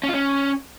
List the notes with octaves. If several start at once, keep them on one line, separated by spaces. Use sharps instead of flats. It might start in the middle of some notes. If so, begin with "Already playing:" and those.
C#4
F4
C#4